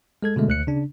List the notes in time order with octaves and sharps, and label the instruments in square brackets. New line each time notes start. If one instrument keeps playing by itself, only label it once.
[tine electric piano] G#3 A4 G#6
B2 D3 G#3 A3
D2 F#6 C#7
C#3 D4